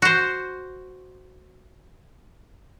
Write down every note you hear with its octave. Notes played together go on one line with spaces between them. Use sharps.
F#4 C5